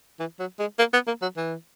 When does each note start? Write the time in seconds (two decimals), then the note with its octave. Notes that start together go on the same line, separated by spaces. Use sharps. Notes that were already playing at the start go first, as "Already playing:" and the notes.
0.19 E3
0.39 F#3
0.59 G#3
0.79 A#3
0.93 B3
1.07 A#3
1.22 F#3
1.37 E3